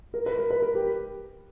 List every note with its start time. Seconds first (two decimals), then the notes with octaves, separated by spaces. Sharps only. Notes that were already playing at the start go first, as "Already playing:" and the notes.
0.14 A#4
0.26 B4
0.39 A#4
0.50 B4
0.62 A#4
0.75 G4